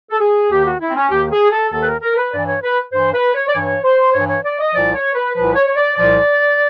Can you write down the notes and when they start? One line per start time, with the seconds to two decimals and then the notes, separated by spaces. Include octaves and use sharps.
0.11 A4
0.21 G#4
0.51 D#2 D#3 G4
0.65 F#4
0.82 E4
0.89 C4
0.96 C#4
1.11 D#2 D#3 G4
1.26 G4
1.32 G#4
1.52 A4
1.72 D#2 D#3 A4
1.82 B4
1.87 A#4
2.02 A#4
2.17 B4
2.33 G2 E3 D5
2.47 C#5
2.63 B4
2.93 G2 E3 C5
3.14 B4
3.34 C#5
3.48 D5
3.54 G2 E3 C#5
3.84 C5
4.14 G2 E3 C#5
4.29 C#5
4.45 D5
4.60 D#5
4.75 C2 A#2 F3 D5
4.95 C#5
5.15 B4
5.36 C2 A#2 F3 B4
5.55 C#5
5.68 C#5
5.76 D5
5.96 C2 A#2 F3 D5